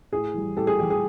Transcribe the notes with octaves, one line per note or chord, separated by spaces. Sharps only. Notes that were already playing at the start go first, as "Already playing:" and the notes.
A2 G#4
E3 G3
A2 G4 A4
G#4
E3 G3 G4
G#4